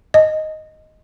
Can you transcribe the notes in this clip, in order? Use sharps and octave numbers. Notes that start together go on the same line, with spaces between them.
D#5